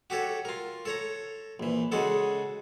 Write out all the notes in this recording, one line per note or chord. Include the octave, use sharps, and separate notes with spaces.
F#4 G4 A4 C#5
F4 A#4
A4 C#5 A#5
A#1 E3
C#3 G#3 F#4 A4